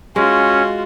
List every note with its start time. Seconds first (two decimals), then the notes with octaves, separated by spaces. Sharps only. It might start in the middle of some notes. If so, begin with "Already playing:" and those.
0.16 G#3 C#4 F4 F#4